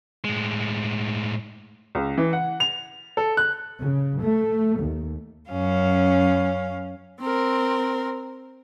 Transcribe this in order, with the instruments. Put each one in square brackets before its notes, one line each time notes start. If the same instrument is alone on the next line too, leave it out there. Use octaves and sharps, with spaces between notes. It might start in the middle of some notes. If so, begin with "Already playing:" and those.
[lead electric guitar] A2 G#3
[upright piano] C#2
E3
F#5
F7
A4
F#6
[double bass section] C#3
A3
D#2
[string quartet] F#2 C#4 F5
[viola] C4 A#4